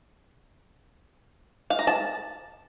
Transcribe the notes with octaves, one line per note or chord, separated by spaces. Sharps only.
F5
A#5
A5